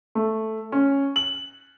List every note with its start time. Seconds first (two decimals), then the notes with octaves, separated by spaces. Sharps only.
0.15 A3
0.72 C#4
1.16 F#7